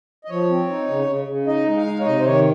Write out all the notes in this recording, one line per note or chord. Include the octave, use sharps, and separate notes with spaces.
D#5
F3 C#5
C4
D#4
C#3
C#3
C#3
D#4 D#5
G#3
F5
D#4
C#5
C3 D#5
C5
D#3 C#5